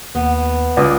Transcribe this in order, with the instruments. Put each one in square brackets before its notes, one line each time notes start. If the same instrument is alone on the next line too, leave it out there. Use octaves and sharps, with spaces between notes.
[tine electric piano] D#2 [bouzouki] B3
[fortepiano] C#2 [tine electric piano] D5 D#6